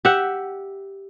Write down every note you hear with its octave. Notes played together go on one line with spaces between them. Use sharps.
G4 E5 F#5